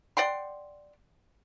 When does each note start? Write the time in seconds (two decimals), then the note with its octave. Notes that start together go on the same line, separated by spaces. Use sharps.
0.17 D5 F#5 G5 C6